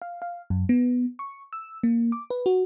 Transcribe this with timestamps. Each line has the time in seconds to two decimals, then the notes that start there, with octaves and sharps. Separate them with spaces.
0.02 F5
0.22 F5
0.50 F#2
0.69 B3
1.19 C#6
1.53 E6
1.83 A#3
2.12 D6
2.30 B4
2.46 F#4